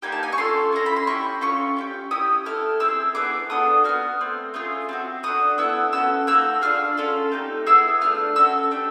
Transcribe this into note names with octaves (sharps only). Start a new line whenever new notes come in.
A#3 D#4 G4 G#5
A5
G#5
C#6
C#4 F4 A4 C6
C#4 E4 A4 A#5
B5
C6
C#4 E4 G4 C#6
C#4 F4 A4 C#6
C#4 E4 G4
C#4 E4 G4 D#6
A3 C4 E4 A4 F6
C4 E4 G#4 E6
B3 E4 G#4 D6
B3 D4 F4 A4 D#6
B3 D#4 F#4 F6
A3 C4
A3 C#4 F4 G#4
C4 D#4 F#4
D4 F#4 A4 D#6
B3 E4 A4 E6
C#4 F#4 A4 E6
A#3 D#4 F#4 A4 E6
D4 F4 G#4 F6
C#4 F4 A4
A3 C4 D#4 G4
B3 E4 G#4 E6
A3 D4 F4 F6
C#4 F#4 A4 E6
A3 D4 G4